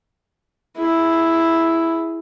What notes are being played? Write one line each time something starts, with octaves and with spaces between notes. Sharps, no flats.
E4 G#4